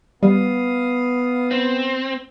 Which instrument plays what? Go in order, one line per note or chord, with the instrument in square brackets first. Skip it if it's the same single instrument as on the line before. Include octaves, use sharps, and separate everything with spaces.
[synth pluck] G3 [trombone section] B3 [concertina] F5 D#6
[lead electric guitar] C4